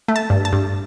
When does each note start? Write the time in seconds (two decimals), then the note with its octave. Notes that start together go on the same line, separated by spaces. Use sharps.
0.08 A3
0.16 A5
0.30 G2
0.45 A5
0.53 G2